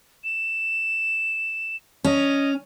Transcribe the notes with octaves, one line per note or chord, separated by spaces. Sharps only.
E7
C#4 D#5